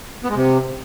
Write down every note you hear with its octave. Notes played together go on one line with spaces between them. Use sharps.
B3
G#3
C3